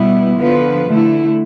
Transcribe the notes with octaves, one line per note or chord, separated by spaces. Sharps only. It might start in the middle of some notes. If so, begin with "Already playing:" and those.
Already playing: B2 G3 B3 E4
D3 F3 B3 F4 B4
D3 A3 E4